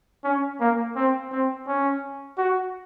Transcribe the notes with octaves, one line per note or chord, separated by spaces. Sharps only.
C#4
A#3
C4
C4
C#4
F#4